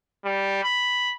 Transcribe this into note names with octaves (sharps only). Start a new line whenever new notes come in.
G3
B5